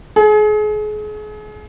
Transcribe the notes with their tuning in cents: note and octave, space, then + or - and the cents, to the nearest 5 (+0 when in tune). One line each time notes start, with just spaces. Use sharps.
G#4 +35